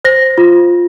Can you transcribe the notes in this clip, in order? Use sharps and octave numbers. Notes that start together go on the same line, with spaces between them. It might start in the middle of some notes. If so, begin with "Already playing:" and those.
C5 A#6
F4